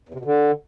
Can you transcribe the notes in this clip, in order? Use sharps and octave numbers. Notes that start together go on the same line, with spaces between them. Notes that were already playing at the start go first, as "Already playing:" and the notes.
E2
C3
B2
D3